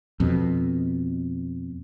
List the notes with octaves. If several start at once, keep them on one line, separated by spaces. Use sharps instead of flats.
F2 B2